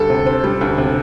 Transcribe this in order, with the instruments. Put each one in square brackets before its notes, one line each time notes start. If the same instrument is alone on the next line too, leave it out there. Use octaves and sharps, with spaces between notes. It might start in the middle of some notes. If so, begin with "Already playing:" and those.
Already playing: [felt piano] D2 G3 [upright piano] A4
[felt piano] C3
C4
G3
D2
C3